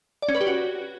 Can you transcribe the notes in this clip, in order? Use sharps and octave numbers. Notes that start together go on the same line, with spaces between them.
D5
C#4
B4
G4
F#4